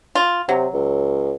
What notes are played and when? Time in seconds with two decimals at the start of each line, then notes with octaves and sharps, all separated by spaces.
0.15 F4
0.49 C3 F#3
0.74 C#2